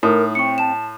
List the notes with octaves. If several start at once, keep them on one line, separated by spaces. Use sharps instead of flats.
A2 D#4 E4 A#4 D#6
C4 C#6 C#7
A5 E7